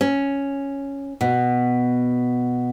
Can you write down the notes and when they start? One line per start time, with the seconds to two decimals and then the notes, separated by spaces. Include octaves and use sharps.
0.01 C#4
1.21 B2